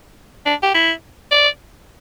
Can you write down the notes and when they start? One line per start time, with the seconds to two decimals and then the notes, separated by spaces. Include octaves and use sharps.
0.46 D4
0.62 G4
0.74 E4
1.31 D5